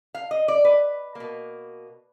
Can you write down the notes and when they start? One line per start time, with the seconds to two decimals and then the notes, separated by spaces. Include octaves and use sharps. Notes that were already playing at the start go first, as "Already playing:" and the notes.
0.14 F5
0.31 D#5
0.48 D5
0.65 B4
1.15 B2 A#3